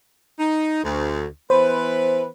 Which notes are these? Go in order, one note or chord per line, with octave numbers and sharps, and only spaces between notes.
D#4
D2
E3 B3 B4 C5